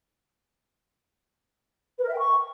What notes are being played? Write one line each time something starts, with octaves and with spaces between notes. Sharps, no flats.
B4
A#4
E5
G5
C#6